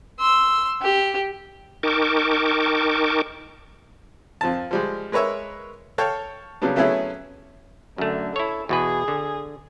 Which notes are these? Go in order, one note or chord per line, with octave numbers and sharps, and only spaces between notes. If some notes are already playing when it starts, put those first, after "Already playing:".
C6 E6
G4
D#4 A#4 G5 A5 C#6 D6
F2 F3 A5
F3 G3 G#3
G#3 A#4 B4 C#5 E5
A4 C#5 F5 G5
C#3 F#3 G3 B3 D4
F#3 A3 B3 C#4 E4 G#4
F#2 D3 A3
E4 A4 C#5
E2 B2 G#4 B4
D3